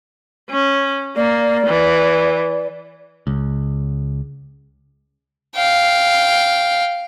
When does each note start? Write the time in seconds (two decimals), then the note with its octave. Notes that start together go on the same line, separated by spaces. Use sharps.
0.50 C#4
1.16 A#3 D5
1.67 E3
3.27 C#2
5.56 F5 G5